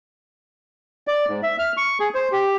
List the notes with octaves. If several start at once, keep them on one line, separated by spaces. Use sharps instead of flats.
D5
G#2
E5
F6
C#6
G#4
C5
G4